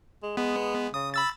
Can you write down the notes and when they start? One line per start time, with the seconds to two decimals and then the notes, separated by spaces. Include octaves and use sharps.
0.23 G#3
0.37 G#3 B3
0.94 C#3 D#6
1.14 B5 E6 A6